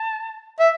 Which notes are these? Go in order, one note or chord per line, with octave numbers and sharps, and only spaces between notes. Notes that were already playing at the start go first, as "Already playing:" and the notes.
Already playing: A5
E5